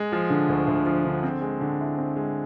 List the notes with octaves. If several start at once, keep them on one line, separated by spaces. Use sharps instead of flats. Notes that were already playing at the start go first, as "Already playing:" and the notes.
Already playing: G#3
F3
D3
D2
D2
F3
D3
C4
G#3
D3
E4
C4
G#3